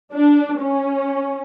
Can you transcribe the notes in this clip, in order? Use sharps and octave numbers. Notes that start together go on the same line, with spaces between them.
D4
C#4